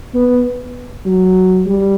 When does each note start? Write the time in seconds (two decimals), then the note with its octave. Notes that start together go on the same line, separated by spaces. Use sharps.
0.14 B3
1.05 F#3
1.66 G3